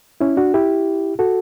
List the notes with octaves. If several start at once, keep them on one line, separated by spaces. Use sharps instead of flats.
C#4 E4
D4 F#4
E4 G4
F#4 A4